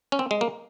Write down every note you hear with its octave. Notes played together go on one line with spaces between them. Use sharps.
C#4
C4
G#3
A#3